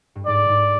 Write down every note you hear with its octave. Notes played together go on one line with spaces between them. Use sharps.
G2
G#2 D5
G#2